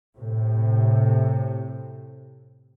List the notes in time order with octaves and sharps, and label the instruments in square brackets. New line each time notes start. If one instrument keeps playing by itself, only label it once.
[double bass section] A2 C3